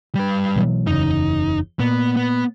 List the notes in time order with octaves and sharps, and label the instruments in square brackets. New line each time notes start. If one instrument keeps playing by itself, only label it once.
[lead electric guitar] G3 B4
[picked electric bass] B2 E3 F#3
[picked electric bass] F#1 E2 C#3 [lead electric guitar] D#4
[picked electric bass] A#2 [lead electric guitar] B3
[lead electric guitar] B3